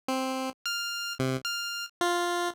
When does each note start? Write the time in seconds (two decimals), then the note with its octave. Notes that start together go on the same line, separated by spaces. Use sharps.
0.08 C4
0.66 F6
1.19 C3
1.45 F6
2.01 F4